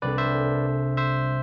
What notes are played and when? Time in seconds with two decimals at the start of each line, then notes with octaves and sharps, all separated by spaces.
0.02 C2 C3 G3 D4 A4 B4 D5
0.18 C5 E5
0.97 C5 E5